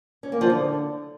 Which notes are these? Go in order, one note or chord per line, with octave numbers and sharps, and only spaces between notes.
C#4
A#3
F3
D3